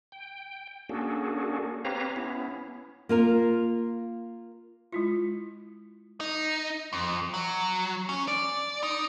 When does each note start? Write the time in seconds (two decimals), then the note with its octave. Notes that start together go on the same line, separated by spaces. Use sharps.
0.12 G5
0.89 A#3 C#4 D4 F#4 G#4 A4
1.85 C4 G4 B4 C#5 F5 A#5
2.16 B3 C#4 E4
3.09 A#3 F4 A#4
4.92 G#3 E4 F4
6.20 D#4
6.93 F2
7.34 F#3
8.09 C#4
8.28 D5
8.83 D#4